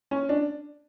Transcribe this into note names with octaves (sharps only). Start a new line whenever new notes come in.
C#4
D4